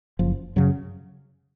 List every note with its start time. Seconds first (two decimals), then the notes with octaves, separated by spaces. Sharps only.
0.19 F#1 F3
0.56 F#2 C#3 F#3